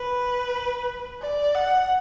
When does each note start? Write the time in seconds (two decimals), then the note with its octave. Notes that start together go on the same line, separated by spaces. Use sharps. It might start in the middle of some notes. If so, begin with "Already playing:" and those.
Already playing: B4
1.21 D5
1.55 F#5